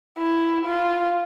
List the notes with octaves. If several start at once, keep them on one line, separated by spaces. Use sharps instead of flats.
E4
F4